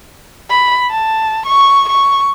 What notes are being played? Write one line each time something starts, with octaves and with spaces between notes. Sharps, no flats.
B5
A5
C#6
C#6